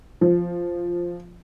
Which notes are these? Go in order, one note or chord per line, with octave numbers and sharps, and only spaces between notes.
F3